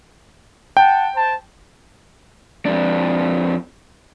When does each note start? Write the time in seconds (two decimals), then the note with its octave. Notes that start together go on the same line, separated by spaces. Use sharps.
0.77 F#5 G5 A5
1.16 C5 A5
2.65 F2 D4